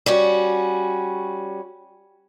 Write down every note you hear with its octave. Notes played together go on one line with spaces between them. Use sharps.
G3 C#4 F#4